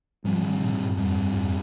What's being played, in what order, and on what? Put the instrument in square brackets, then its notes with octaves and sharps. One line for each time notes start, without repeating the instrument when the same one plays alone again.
[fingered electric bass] G#2 G3 C4 [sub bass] F3
[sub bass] D#3
A#2
G2
[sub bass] F2 [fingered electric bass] G#2 G3 C4
[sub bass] G2
F2